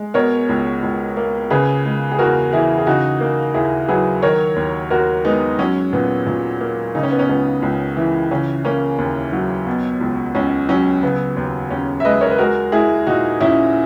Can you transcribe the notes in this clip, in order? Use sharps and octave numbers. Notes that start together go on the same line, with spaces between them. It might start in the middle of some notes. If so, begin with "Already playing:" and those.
Already playing: G#3
B2 A#4 C#5
C#2
C#2
A#3
C#3 G#4 B4
G#3
G#4
E2 F#4 A#4
E3 E4 G#4
G#4
C#3 D#4 F#4
A#3
D#2 E4 G#4
F#3 G#4 B4
D#3 A#4 C#5
D#2
D#2 F#4 A#4
G#3 B3 D#4
F#3 C#4
A#2 B3
A#2
A#3
C#3 D#4
C#4
B3
C#4
C#2 B3
C#2
E3
C#3 C#4
A#3 C#4
D#2
F#3
B2
C#2
C#2 C#4
F#3 C#4
C#3 B3
D#2
D#2 C#4
E5
G#3 B4 D#5
A#4 C#5
B4
G#3 F#4 A#4
G#3 E4 G#4
A#2 D#4 F#4
A#2 C#4 E4